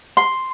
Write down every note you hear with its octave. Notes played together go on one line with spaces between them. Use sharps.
C6